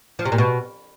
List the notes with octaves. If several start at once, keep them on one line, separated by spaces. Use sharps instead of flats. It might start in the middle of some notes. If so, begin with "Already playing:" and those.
F3
C3
A#2
B2